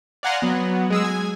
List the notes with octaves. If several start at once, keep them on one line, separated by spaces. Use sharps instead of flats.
D5 F5 F#5 G#5 A#5 C6
F#3 B3
G#3 G#4 E6
G#5